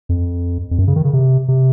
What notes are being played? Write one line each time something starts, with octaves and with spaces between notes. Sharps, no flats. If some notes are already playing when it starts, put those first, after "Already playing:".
F2
F2
F#2
C#3
D#3
C#3
C3
C3